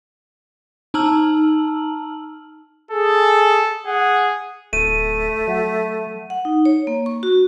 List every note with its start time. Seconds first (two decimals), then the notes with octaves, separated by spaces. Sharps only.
0.94 D#4 A5 A#5 E6 F6 F#7
2.91 G#4 A4
3.86 G#4 F#5
4.73 D1 A3 D#7
5.48 F#3 E5 F#5
6.30 F#5
6.45 D#4
6.65 C#5
6.87 A#3
7.06 C#6
7.23 F#4